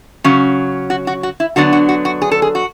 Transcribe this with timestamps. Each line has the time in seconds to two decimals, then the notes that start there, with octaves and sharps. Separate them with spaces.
0.24 C#3 F#3 C#4
0.90 F#4
1.07 F#4
1.23 F#4
1.40 E4
1.56 D3 F#3 B3 D4 F#4
1.73 F#4
1.89 F#4
2.05 F#4
2.22 G#4
2.31 A4
2.42 G#4
2.55 F#4